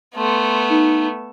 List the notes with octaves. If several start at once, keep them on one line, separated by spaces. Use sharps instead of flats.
A3 B3 C6
D#4